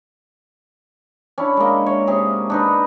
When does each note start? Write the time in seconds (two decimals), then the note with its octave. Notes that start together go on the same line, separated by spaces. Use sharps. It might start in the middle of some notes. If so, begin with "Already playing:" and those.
1.38 C#4 D4 E4
1.57 G#3 A#3
1.86 C#5
2.07 C3 C#4 G#4
2.50 D4 D#4 B4